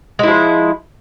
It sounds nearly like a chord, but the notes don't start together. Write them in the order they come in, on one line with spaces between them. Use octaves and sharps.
G#3 E4 F3